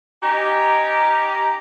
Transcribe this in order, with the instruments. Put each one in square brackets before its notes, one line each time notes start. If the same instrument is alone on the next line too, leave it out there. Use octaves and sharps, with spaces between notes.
[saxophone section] C#4 D#4 G4 [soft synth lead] A#5